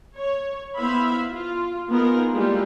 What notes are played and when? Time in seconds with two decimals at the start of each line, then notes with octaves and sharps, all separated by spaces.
0.17 C#5
0.77 B3 E4 C5 E5 F5 B5
1.31 F4
1.90 B3 D#4 F4 G#4 A#4
2.33 G3 G#3 A#3 E4 F4 G4